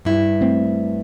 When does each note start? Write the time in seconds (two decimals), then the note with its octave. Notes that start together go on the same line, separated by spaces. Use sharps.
0.05 G2 E4
0.41 A3 C4